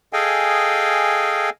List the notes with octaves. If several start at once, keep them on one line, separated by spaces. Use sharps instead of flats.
G#4 A4 D#5 F5 G5 G#5